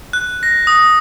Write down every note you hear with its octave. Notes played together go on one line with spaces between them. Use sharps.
F#6
A#6
D#6